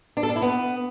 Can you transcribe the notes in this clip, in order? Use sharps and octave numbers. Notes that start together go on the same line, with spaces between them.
D4
A4
D4
E4
B3